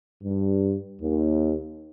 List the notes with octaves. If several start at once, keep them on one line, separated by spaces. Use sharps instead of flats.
G2
D#2